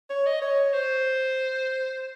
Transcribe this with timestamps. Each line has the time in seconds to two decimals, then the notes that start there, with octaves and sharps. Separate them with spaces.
0.10 C#5
0.26 D#5
0.42 C#5
0.73 C5